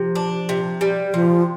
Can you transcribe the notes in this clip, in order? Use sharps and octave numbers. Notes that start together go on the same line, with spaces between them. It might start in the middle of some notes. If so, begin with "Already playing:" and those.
Already playing: C3 F3
D4
C3
G3
C3 F3